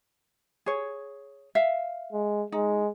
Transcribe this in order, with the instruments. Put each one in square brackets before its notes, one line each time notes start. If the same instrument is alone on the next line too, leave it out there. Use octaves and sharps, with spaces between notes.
[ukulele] G#4 C#5
E5 F5
[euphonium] G#3
[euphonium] G#3 [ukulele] D#4